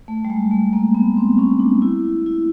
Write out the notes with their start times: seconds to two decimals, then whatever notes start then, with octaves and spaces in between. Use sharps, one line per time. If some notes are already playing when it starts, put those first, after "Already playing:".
0.08 A3
0.25 G3
0.30 G#3
0.51 A3
0.73 A#3
0.95 B3
1.17 C4
1.38 C#4
1.60 D4
1.82 E4
2.26 E4